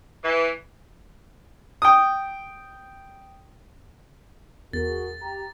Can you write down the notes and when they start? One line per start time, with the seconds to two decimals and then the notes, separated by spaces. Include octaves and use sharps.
0.24 E3
1.82 G5 D#6
4.73 E2 F#4 G#4 A#4 A6
5.21 G4 A#5